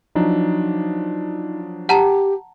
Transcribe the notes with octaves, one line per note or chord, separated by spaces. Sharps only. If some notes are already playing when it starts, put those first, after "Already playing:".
F3 F#3 D4 D#4
G4 F#5 A5 A#5